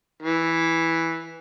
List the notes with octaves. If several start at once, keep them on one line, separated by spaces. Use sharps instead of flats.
E3